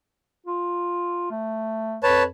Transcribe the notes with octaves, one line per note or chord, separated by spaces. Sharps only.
F4
A3
F2 B4 C#5 A5